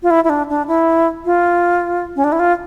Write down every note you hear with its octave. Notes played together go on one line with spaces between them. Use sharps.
F4
E4
E4
D4
D4
E4
F4
C#4
D4
E4
F4